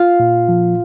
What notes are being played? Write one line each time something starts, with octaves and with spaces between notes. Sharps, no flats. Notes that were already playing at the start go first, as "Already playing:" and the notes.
Already playing: F4 F5
A#2
F3